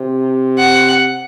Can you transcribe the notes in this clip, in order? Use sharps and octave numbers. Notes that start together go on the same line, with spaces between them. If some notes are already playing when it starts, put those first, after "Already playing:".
Already playing: C3
F#5